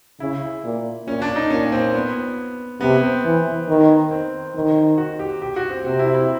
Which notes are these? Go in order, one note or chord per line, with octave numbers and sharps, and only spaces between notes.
C#3 E4
A#2
A#2 C#4
D4
D#4
A#2 C#4
C4
B3
C3 B3
C4
E3 B3
D#3
C4
D#3
F#4
G4
G4
F#4
C4
C3 C4
E4
E4